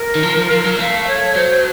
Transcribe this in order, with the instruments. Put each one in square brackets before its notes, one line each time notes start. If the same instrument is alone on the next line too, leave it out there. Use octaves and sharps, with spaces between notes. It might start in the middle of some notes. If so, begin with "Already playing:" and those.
Already playing: [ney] A#4
[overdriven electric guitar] D#3
F3
F3
F3
F#3
[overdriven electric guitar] A3 [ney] F5
[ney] C#5
[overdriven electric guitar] F#3 [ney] C5